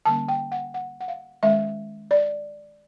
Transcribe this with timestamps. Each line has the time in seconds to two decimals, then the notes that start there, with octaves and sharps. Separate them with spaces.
0.06 D3 G3 A#3 C#4 A5
0.28 G5
0.52 F#5
0.74 F#5
1.00 F#5
1.08 F5
1.43 D#3 G#3 C#4 E5
2.11 D5